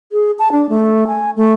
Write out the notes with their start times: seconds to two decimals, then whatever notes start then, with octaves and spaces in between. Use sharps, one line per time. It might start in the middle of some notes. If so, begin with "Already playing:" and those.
0.12 G#4
0.39 A5
0.52 D4
0.69 A3
1.07 G#5
1.36 A3